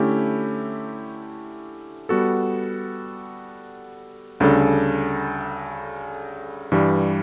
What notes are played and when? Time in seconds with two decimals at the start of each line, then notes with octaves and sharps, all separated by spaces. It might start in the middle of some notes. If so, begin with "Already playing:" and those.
Already playing: D3 A3 C#4 E4 G4
2.09 G3 B3 F#4 A4
4.40 D2 C#3 G3 D4 A4
6.72 G2 E3 G3